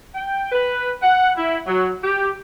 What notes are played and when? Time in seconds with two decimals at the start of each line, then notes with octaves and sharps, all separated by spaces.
0.15 G5
0.52 B4
1.03 F#5
1.37 E4
1.67 F#3
2.03 G4